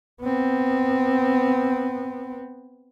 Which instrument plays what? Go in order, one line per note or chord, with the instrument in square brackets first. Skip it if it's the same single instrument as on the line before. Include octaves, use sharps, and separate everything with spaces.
[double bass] B3 C4